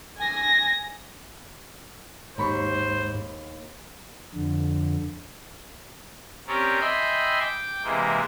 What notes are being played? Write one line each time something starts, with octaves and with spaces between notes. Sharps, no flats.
G#5 A#6
D#2 G#2 C5 B5 C#6
F2 D3
C4 C#4 G4 A#4 C#5 D5
D#5 E5 G5 G#5 B5 C6
G5 D6
C3 E3 G#3 A#3